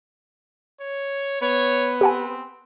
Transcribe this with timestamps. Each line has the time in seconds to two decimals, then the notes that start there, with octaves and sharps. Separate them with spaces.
0.81 C#5
1.42 B3 C#5
2.01 C4 G4 F#5 G#5